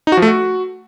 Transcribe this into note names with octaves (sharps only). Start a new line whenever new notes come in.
D#4
F#4
F3
A3
F#4